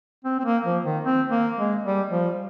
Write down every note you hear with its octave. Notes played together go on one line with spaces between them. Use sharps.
C4
C4
A#3
F3
D#3
C4
A#3
G#3
G3
F3